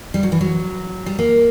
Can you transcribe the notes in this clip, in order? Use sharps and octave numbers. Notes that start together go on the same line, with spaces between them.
G3
F#3
E3
F#3
G3
A#3